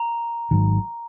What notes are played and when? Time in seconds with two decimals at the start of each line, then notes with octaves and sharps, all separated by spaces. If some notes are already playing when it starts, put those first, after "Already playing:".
Already playing: A#5
0.51 G#1 G#2 D#3 F#3